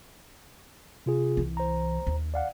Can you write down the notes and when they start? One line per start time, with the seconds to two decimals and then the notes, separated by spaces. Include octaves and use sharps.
1.06 C3 F4 G#4
1.37 C2 E3
1.57 C5 A#5
2.07 D#2
2.34 D5 F5 F#5